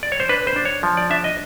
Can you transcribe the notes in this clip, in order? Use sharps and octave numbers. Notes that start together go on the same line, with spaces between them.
D5
C#5
C5
D4 B4
C5
D4
C#5
F3
D5
D4 E5
D#5